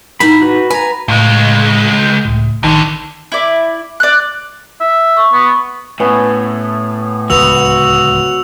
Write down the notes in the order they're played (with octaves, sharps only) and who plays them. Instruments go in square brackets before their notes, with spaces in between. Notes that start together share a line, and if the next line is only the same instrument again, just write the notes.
[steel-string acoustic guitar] A2 D#4 [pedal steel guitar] B5
[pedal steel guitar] F#4 B4
[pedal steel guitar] B4 A#5 [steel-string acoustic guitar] G#5
[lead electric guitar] C#2 G#3 [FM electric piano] A2
[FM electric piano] G6
C#2 A2
[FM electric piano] A1 D#3 A5 [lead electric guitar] F2 D3
[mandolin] E4 D5
D5 F#6
[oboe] E5
[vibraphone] C#6
[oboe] B3
[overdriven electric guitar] A2 [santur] B3 C#4
[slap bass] D1 C#2 D3 [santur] B3 [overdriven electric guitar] F#4 [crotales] E6 F7